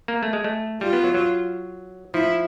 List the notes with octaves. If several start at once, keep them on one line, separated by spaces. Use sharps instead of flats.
A#3
A3
G#3
A3
G3 F4
B3
F#3
F#3
F3 E4